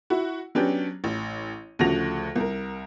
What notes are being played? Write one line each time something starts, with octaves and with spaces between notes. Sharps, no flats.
E4 F#4
F#3 B3 C#4 D4 G4
A1
D2 C#3 F3 F#4 A#6 F7
C2 A#4